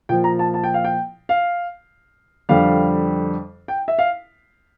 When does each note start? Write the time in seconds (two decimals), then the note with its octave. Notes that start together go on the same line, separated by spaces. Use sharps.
0.09 A#2 F3 G5
0.24 A#5
0.39 A5
0.54 A5
0.64 G5
0.74 F5
0.84 G5
1.29 F5
2.49 F2 D3 G3 F5
3.68 G5
3.88 E5
3.99 F5